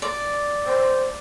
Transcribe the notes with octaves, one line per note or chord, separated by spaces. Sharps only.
D5
C5